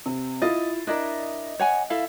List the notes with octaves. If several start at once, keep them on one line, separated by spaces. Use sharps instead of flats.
C3
E4 F4 D#5 A6
D4 E4 A#4 D#5
C#5 F#5 G#5
E4 A4 F5